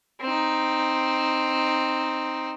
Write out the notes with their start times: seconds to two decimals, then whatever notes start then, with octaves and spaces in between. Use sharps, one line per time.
0.21 C4 D#4